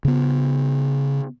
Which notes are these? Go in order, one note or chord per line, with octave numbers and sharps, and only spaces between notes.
C#3 B3